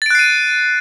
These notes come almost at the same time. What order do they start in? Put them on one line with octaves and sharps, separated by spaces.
A6 D7 F#6 C7 D#7